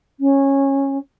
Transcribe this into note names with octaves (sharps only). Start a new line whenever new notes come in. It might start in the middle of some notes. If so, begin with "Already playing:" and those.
C#4